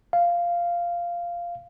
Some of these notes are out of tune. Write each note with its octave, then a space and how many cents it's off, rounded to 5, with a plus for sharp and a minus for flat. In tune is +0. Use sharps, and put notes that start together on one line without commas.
F5 -10